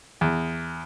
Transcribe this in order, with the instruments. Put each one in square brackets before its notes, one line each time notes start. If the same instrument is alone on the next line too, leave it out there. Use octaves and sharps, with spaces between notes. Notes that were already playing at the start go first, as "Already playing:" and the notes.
[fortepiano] E2